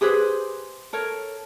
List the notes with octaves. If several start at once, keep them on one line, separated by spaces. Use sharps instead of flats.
G4 G#4 B4 C5
A4 A#4 C#5